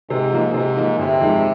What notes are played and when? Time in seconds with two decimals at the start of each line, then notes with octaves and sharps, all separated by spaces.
0.10 G#2 C3
0.32 F3 A#3 D#4
0.54 G#2 C3
0.76 F3 A#3 D#4
0.98 G1 C3
1.20 F2 D#3 G#3